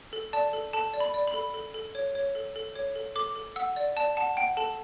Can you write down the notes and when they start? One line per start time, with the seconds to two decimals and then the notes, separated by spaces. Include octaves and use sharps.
0.13 A4
0.33 D5 A5
0.53 A4
0.73 A4 A5
0.94 D5
1.00 B5
1.14 D5
1.28 B5
1.34 A4
1.54 A4
1.74 A4
1.95 C#5
2.15 C#5
2.35 A4
2.56 A4
2.75 C#5
2.95 A4
3.15 A4 D6
3.36 A4
3.56 F#5 E6
3.76 D5
3.97 D5 A5
4.17 F#5 A5
4.37 F#5 G5
4.57 A4 A5